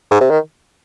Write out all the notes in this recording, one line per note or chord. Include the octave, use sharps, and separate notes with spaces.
G#2
C3
D#3